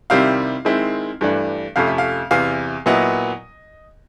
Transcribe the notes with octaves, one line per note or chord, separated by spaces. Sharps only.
C3 D#3 G3 C4 E4 F5
D#3 G#3 C4 E4
G2 E3 A3 D4
F2 C3 F3 A3 C#4 F5
E5
F5
E2 C3 E3 F5
A#2 F#3 B3 E4 D#5